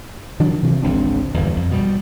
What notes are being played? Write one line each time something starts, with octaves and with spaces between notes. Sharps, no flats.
D#3 F#3 D4
C3 E3 F3
G#1 C#2 C4 D4
G1 E2
F2
B2 G3